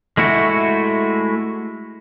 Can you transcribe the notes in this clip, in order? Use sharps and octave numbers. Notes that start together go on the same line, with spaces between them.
G#3 A3 E4 F#4